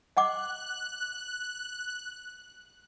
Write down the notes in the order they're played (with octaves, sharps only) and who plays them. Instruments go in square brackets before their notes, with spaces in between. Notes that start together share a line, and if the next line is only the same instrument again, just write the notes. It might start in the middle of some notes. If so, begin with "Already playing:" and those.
[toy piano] D#5 F#5 D6 [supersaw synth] F#6